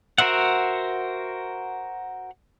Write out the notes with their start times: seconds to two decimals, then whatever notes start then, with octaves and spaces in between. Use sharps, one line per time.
0.18 F#4 A#4 C5 E5 F#5